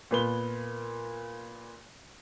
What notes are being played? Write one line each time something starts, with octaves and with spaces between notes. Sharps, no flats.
A#2 B3 G7